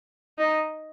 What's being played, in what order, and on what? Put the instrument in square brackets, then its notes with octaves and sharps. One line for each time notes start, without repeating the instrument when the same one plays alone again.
[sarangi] D#4